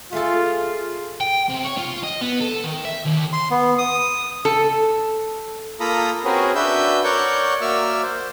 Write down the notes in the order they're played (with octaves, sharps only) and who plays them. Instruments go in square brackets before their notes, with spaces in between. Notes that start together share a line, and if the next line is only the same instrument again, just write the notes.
[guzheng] A3 G#4 A4 [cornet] F4
[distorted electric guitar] G5
C3
C#5
F4
D#5
B3
A4
D#3
E5
D#2
[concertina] C6
B3
D#6
[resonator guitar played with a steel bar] A4
[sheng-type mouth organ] A#3 F4 A4 A#5 B5 D#6
C4 C#4 F#4 G#4 A#4 B4
D4 F#4 B4 E5 E6 G6
A#4 C#5 D5 F#5 C#6 G6
A#3 F#4 D5 E5 E6 F6
C5